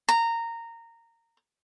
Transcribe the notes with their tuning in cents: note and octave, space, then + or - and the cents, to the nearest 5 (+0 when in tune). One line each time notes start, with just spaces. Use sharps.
A#5 -15